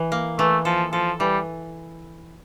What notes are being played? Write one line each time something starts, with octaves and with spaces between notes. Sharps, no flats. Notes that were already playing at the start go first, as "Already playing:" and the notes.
Already playing: E3
A#3
E3 A3
F3 A4
F3 A4
E3 G3